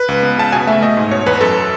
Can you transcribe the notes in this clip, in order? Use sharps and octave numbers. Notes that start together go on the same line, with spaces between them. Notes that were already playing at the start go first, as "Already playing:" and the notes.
Already playing: B4
C#2
B3
C#3 A5
B2 G#5
A3 E5
A3 D#5
G#2
B2 C#5
E2 B4
F#2 A4